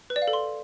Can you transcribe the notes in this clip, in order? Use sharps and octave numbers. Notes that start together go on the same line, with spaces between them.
B4
D5
F5
A4
C6